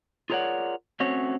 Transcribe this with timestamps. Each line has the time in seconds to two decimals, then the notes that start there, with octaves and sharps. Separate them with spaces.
0.30 F4 G#4 A#4 C#5 D5 F#5
1.00 A3 C4 C#4 F#4 C#5